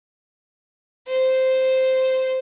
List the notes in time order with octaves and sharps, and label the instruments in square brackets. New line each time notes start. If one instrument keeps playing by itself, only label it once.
[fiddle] C5